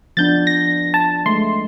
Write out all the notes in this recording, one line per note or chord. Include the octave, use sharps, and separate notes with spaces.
F3 B3 D4 G6 A6
A#6
A5
G#3 A3 C6